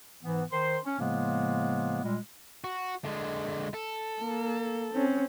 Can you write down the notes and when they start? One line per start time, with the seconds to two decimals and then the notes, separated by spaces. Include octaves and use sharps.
0.23 G#2 E3 B3
0.52 D#3 C5 C6
0.85 C#4
0.99 A2 C#3 F3 G#3 A#3 B3
2.03 A#2 G3 G#3
2.64 F#4
3.05 D3 G#3
3.74 A4
4.21 A#3
4.93 C4 C#4